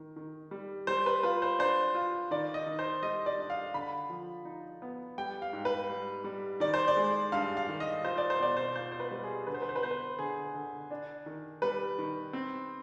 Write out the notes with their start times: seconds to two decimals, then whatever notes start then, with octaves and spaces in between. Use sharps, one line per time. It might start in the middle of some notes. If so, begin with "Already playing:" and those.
Already playing: D#3
0.16 D#3
0.51 G3
0.87 G3 C5
1.06 B4
1.23 F4 B4
1.42 C5
1.59 D4 C5
1.95 F4
2.31 D#3 D5
2.54 D#5
2.66 D#3
2.79 C5
3.02 G3 D#5
3.26 D5
3.38 D4
3.50 F5
3.74 D3 B5
4.10 F3
4.45 D#4
4.82 B3
5.18 G3 G5
5.42 F5
5.53 G#2
5.65 B4
5.90 G3
6.24 G3
6.60 D#3 D5
6.74 C5
6.88 D5
6.97 G#3
7.32 G2 F5
7.57 F5
7.69 D#3
7.80 D#5
8.04 F4 C5
8.18 D5
8.30 C5
8.40 B2 D5
8.57 C5
8.75 F4 C5
8.92 C5
9.00 B4
9.11 G3
9.23 G#4
9.47 D3 B4
9.54 C5
9.62 B4
9.69 C5
9.76 B4
9.83 B3 C5
9.91 B4
10.19 D3 G#4
10.54 D3
10.91 D4
11.26 D#3
11.62 G3 B4
11.98 D#3
12.33 C4